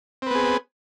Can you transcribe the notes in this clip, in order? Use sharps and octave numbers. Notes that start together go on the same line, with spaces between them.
B3 C4 G#4 B4